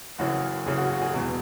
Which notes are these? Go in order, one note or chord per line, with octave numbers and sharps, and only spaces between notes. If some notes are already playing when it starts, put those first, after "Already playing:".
F#1 F#2 C#3 E3 F#4
F#1 F#2 C#3 E3 G#4
F#4
F#4
G#4
E1 E2 B2